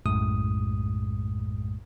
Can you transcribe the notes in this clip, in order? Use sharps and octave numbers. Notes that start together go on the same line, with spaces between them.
B1 F#2 A2 G#3 D#6